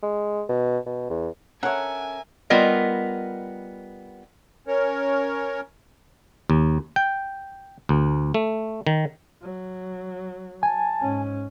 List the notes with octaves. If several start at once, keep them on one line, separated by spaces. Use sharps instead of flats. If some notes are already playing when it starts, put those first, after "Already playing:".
G#3
B2
B2
E2
C#4 A4 A#4 C#5 E5 F#5 G#5
G3 B3 F4 A#4 D#5
C#4 A#4 C#5
D#2
G5
D2
A3
D#3
F#3
G#5 A5
G#2 C#4